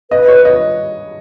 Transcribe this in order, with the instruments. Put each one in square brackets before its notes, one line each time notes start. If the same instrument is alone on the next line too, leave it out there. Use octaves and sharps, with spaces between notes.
[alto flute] B4 [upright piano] D#5
[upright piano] C#5
D#5